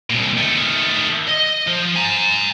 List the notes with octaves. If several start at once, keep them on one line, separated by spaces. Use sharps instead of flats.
C2 A#2
D#3 A3
D#5
F3
G#5 A#5